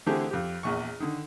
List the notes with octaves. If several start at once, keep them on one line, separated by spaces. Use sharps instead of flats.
D3 E3 A3 C4 G4 G#4
F2 G4
A#1 E2 C#6
D3 D#3